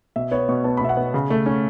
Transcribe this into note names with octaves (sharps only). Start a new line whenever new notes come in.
B2 E5
B3 C#5
B2 C#6
B3 A5
B5
B2 E5
F#5
B3
C#3
A3
C#4